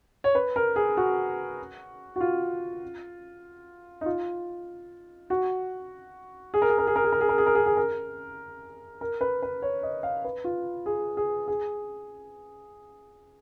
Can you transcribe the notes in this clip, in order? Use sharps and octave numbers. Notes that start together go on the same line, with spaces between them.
C#5
B4
A#4
G#4
F#4
F#4
F4
D#4
F4
F#4
G#4
A#4
G#4
A#4
G#4
A#4
G#4
A#4
G#4
A#4
G#4
A#4
G#4
G#4
A#4
A#4
B4
B4
C#5
D#5
F5
B4
F4
G#4
G#4
G#4